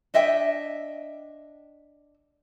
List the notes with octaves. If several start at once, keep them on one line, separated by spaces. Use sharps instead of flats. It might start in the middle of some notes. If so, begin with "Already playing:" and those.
D4 D#5 E5 G5